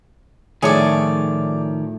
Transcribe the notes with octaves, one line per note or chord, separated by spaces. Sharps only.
A2 D#3 F3 G#4 C#5 D5